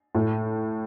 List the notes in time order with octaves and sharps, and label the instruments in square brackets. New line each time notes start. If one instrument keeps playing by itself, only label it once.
[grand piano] A2